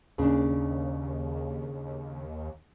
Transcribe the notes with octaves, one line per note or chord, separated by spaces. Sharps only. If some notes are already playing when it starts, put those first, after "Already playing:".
D#2 C#3 A#3 D4 D#4 G#4